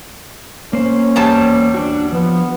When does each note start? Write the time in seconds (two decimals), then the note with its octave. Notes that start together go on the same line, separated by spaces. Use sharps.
0.73 A#3 C#4 C5
1.16 E2 G3 A5
1.74 D4 F#4
2.13 F3 B3